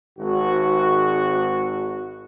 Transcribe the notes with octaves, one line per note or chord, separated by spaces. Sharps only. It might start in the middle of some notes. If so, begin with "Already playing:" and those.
G#1 F#4